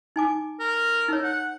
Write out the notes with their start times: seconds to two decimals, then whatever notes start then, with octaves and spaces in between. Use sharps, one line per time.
0.16 D#4 G#5 D6
0.60 A#4
1.08 D#4 A#4 C#5
1.24 F#5